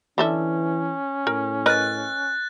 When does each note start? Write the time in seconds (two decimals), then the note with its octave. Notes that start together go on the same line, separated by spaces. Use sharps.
0.18 D3 E3 C#4 A4 E5
1.27 A2 A#4
1.66 A#4 B4 D#5 F#6 A6